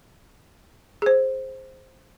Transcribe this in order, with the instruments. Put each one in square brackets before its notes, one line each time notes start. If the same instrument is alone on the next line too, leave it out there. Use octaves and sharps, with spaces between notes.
[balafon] G#4 C5